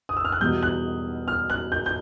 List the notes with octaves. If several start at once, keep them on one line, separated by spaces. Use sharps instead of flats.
D#6
E6
F6
F#6
E2 B2 G3 B3 G6
F#6
F6
F#6
G6
G6